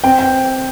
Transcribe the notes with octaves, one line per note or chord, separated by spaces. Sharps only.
C4 G5
G5